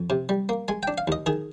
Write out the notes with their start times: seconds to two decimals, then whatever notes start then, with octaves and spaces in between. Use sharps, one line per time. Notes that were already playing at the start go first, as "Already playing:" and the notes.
Already playing: F2
0.10 C3
0.29 G3
0.49 A#3
0.68 G#3 G#5
0.83 D4 G5
0.98 F5
1.08 D#2 D#5
1.26 D#3 G#4